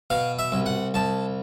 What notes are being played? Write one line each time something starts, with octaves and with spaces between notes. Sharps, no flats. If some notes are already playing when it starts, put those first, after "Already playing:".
B2 F5
E5
C2
F#5
C2 A5